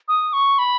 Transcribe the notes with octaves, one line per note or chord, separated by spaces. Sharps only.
D#6
C#6
B5